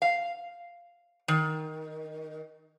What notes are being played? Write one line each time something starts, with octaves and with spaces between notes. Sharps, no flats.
F5
D#3